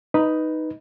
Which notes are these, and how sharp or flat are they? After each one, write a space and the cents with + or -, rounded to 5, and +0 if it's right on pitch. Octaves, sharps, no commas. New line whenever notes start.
D#4 +5 B4 +0